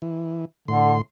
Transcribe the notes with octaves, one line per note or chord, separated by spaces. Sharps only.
E3
A2 D3 C6